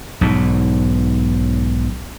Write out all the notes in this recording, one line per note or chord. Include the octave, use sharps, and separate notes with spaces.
B1 G#2